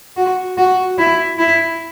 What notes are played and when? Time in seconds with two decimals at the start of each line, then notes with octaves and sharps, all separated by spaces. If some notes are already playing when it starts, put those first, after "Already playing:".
0.17 F#4
0.57 F#4
0.98 E4
1.38 E4